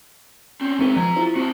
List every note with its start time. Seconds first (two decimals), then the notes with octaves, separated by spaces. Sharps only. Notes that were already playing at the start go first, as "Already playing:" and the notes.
0.61 C4 C#4
0.79 G#3 C4 D#4 A#4 B4
0.97 F3 G#4 A#5
1.16 E4 F4 C5
1.36 C4 F#4 C5